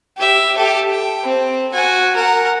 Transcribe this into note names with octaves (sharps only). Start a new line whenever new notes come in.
G4 E5
G4 A4
G5
C4
F#4 G#5
A#4 F#5